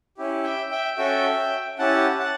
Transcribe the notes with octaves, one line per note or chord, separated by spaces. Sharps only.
C#4 E4 G4
E5 G5
E5 G5
C#4 F#4 A4 E5 G5
C#4 E4 G4 F#5 A5
F#5 A5